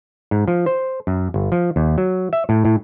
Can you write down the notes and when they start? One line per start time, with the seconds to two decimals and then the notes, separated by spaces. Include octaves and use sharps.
0.31 G#2
0.48 F3
0.66 C5
1.07 F#2
1.34 G1
1.52 F3
1.76 D#2
1.98 F#3
2.33 E5
2.49 A2
2.65 A2